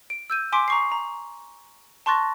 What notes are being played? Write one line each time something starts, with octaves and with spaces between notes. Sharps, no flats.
D7
E6 G6 D#7
G#5 C6 D6 B6 D7
A#5 C#6 C7
A#5
A5 C6 C#6 F#6 A6 A#6